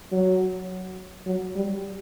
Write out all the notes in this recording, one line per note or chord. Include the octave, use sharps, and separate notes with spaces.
F#3
F#3
G3